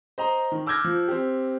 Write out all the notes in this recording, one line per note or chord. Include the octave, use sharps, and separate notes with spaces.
C5 D#5 A#5
D#3
D6 E6 F6 G6 G#6 A#6
F3
C4 G4